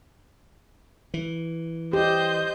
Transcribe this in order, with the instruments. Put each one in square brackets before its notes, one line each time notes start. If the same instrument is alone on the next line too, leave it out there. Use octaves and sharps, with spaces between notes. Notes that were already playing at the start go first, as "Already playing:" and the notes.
[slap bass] E3
[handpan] G4 [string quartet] C5 D#5 G6